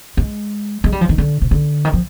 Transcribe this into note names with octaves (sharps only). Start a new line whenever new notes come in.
G#3
G#3
G3
F3
D#3
D3
C3
D3
D#3
F3